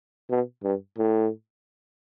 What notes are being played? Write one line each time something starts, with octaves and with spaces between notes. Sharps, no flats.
B2
G2
A2